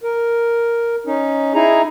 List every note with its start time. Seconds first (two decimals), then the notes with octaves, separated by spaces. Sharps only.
0.03 A#4
1.06 C#4 D#4
1.54 D#4 E4 G#4 A#5